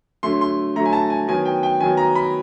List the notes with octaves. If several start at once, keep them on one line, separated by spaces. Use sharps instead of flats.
D3 F#3 A3 C6
C6
D3 F#3 A3 A#5
G#5
A5
G#5
D#3 F#3 B3 G#5
G5
G5
D#3 F#3 B3 G#5
A#5
B5